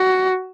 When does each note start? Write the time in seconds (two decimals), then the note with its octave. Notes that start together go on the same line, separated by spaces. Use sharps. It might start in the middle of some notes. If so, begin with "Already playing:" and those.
Already playing: F#4